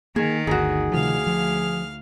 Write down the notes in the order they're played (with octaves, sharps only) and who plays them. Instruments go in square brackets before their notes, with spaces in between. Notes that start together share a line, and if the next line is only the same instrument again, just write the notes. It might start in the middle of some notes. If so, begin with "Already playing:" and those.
[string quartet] D#3 [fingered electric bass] A#3 [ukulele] G#4
[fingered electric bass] G1 D2 [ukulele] D#4 F#4 [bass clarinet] G#4
[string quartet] D2 F5 F6 [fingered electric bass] C3 D#3 F3
[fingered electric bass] F3